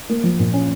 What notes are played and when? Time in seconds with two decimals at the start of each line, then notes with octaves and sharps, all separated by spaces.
0.09 A#3
0.24 F3
0.39 A#2
0.53 C#4